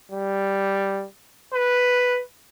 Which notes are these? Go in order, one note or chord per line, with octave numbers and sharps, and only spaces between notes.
G3
B4